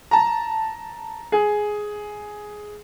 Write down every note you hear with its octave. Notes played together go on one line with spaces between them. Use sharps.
A5 A#5
G#4